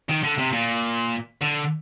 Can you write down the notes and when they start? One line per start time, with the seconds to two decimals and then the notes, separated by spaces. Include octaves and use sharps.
0.09 D#3
0.24 D3
0.39 C3
0.53 A#2
1.42 D3